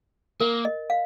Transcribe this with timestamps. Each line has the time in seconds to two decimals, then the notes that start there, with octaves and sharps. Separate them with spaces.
0.40 A#3 A#4
0.65 D#5
0.90 F5